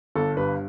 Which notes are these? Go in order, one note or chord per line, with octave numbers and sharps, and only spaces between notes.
G1 A4
G2 B4